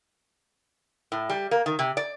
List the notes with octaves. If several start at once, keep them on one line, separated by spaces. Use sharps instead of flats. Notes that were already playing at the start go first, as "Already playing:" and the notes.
A2
G3
A#3
D#3
C3
D5